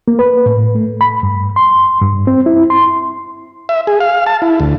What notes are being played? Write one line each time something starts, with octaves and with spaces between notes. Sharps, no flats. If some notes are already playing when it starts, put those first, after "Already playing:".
A#3
B4
A2
A3
B5
G2
C6
G2
C4
E4
C6
E5
G#4
F5
A5
E4
D2